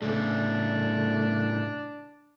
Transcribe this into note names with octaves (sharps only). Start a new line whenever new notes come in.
A2 C#3 A3 D4